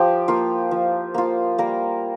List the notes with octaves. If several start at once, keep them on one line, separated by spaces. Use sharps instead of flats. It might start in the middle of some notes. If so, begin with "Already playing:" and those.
Already playing: F3 G4
A#3 F4
F3
A#3 F4
G3 A#3 A#4